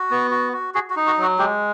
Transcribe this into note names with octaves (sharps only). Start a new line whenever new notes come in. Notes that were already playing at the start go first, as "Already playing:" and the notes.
Already playing: F#4
B3
F#4
F#4
F#4 G#4
F#4
D#4
F#4
F#3 F#4
G#3 G4